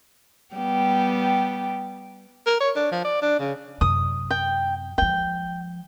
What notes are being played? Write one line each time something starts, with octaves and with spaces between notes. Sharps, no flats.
G3 B3 G4
A#4
C#5
D4
F3
D5
D4
C#3
F#2 C3 D#6
G5
F3 G#3 G5